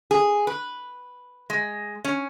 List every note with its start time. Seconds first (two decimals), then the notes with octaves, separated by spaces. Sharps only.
0.11 G#4
0.47 B4
1.50 G#3
2.05 C#4